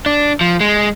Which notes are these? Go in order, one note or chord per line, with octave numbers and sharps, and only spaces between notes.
D4
F3
G#3